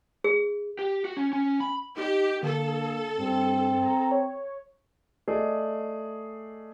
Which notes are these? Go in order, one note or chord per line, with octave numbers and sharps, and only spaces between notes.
G#4
G4
F#4
C#4
C#4
B5
D#4 G4
D3 A#3 A4
G2 C4
A#5
C#5
A3 G#4 D5 D#5